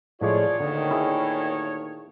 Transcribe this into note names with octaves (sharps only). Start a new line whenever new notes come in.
A2 F3 G#3 F4 G#4 C#5 D5
D2 A#2 D3 D#3
E4 G#4